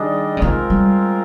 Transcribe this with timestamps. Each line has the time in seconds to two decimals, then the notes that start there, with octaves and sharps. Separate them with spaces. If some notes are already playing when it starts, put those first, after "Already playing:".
Already playing: D#3 G3 D4 G#4 D#5
0.37 D3
0.42 D#3 G#3 C4 F4 A#4
0.70 G3